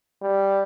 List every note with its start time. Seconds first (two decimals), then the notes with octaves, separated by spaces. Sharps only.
0.22 G3